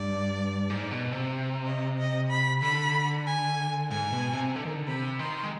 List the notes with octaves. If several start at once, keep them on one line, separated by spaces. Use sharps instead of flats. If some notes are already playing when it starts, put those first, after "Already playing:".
Already playing: G2 D5
G#2
B2
C3
D#5
D#5
B5
D3 B5
G#5
G#2 G#5
B2
C3
D3
D#3
D3
C3 B5
D#3 C6
G#3